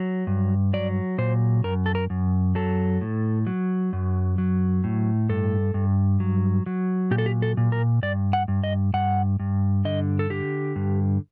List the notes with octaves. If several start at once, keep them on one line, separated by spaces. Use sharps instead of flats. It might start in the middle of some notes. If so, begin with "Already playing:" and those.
Already playing: F#3
G2
F#3 D5
A#2 C5
F#2 A#4
A4
A#4
F#2
F#3 A4
A2
F#3
F#2
F#3
A2
G2 A4
G2
F#3
F#3
A#2 G4
A4
G4
A4
A#2
A#4
G2 D5
F#5
G2
D#5
G2 F#5
G2
D3 D#5
A4
D3 G4
G2